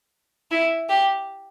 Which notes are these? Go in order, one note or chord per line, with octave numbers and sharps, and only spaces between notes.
E4
G4